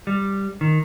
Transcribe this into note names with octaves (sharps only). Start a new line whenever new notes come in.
G3
D#3